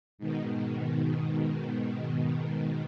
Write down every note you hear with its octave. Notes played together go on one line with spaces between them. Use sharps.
G#2 B2 D#3